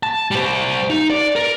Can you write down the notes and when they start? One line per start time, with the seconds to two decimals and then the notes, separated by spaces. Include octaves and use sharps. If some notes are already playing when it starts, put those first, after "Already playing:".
0.03 A5
0.31 G3 C5
0.90 D#4
1.10 D5
1.36 A#4